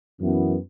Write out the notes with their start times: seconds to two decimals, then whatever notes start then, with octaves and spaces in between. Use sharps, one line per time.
0.20 F#2 E3 B3